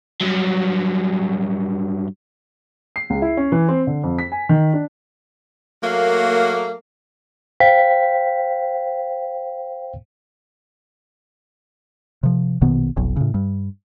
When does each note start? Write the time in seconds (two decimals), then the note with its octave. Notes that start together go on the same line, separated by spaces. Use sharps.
0.21 G2 F#3
2.96 C7
3.10 C#2
3.22 E4
3.37 C#4
3.52 E3
3.69 C4
3.87 D3
4.03 F2
4.19 B6
4.32 G#5
4.49 D#3
4.74 D4
5.84 F#3 A3 A#3
7.60 C5 F5 G5 B6
12.23 C3 F3
12.61 A#1 B2 D#3 B3
12.96 F1 B1
13.16 A2 C#3
13.34 G2